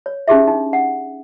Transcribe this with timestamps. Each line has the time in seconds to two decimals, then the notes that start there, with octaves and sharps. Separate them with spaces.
0.06 C#5
0.28 C#4 D#4 F4 G4 G#4 E5
0.47 D4 D#4
0.73 F#5